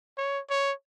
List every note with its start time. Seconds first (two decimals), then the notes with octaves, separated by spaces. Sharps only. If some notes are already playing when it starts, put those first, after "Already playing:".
0.18 C#5
0.50 C#5